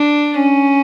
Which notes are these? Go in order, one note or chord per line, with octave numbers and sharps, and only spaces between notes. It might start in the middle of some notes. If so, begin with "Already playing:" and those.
Already playing: D4
C#4